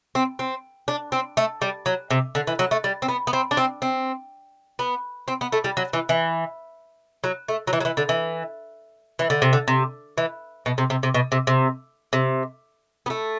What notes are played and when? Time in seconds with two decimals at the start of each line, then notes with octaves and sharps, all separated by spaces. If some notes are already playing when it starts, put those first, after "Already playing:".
0.15 C4
0.39 C4
0.88 D4
1.12 C4
1.37 A3
1.62 G3
1.86 F#3
2.11 C3
2.35 D3
2.47 E3
2.59 F#3
2.71 A3
2.84 G3
3.02 C4
3.08 B3
3.27 B3
3.33 C4
3.51 D4
3.57 C4
3.82 C4
4.79 B3
5.28 C4
5.41 B3
5.52 A3
5.64 G3
5.77 F#3
5.93 E3
6.09 E3
7.24 F#3
7.48 A3
7.67 F#3
7.73 E3
7.80 F#3
7.85 E3
7.97 D3
8.09 E3
9.19 E3
9.30 D3
9.42 C3
9.53 D3
9.68 C3
10.18 E3
10.66 B2
10.78 C3
10.90 C3
11.03 C3
11.14 B2
11.32 C3
11.47 C3
12.13 C3
13.06 B3
13.10 A3